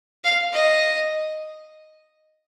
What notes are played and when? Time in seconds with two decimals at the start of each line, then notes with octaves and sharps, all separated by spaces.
0.24 F5
0.53 D#5